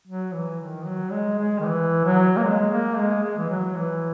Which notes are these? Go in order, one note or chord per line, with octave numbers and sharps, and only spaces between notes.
F#3
E3
D#3
F#3
G#3
G#3
D#3
E3
F#3
A#3
G#3
A#3
G#3
G#3
E3
F#3
E3